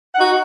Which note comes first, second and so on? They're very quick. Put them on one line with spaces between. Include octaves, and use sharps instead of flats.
F#5 D#4 F#4